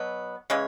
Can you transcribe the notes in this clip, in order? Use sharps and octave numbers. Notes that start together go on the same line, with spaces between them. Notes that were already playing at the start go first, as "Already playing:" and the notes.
Already playing: B2 F#3 B3
C#3 E3 G#3 C#5